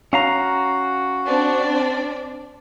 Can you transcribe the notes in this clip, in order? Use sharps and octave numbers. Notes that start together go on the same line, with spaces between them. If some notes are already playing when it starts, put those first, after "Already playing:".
C#4 F#4 F5 A#5
C4 D4 D5